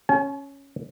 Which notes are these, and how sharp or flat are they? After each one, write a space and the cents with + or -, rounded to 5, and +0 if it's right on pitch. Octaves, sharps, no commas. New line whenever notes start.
C#4 +0 G#5 +45